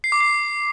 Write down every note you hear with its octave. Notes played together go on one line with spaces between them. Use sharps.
C7
D6
C7